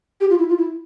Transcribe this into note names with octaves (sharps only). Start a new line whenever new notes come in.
G4
F4
E4
F4
E4